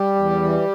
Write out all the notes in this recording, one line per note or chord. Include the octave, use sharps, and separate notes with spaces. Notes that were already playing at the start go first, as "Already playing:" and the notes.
Already playing: G3 G4
E2
E3